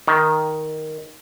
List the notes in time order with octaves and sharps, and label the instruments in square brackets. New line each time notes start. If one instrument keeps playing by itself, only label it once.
[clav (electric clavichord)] D#3